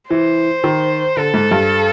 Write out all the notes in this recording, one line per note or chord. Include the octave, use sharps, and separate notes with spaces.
E3 C5
D#3
D3 A4
G#2
G2